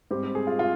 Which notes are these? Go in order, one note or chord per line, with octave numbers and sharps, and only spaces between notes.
G#2 G3 C4 G4
G#4
F4
F4